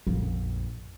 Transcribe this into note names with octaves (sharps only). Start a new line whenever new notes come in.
A#1 F2